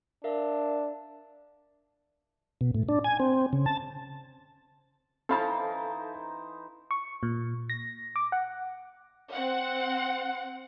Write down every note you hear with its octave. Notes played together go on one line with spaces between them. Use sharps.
D4 A#4 E5 F5
B2
A2
D4
G#5
C4
C#3
A5
E3 C#4 D#4 A4 C5 F5 A5 B5
C#6
A#2
A#6
D6
F#5
C4 F#5